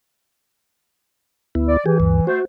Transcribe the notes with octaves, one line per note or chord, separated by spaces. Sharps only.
D2 B3 E4
D5
E3 G4 G#4
D2 G2
A3 F#4 C5